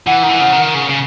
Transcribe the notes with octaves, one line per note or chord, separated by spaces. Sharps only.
E3 F#5
D#3
E3
C#3
D#3
C#3
C#3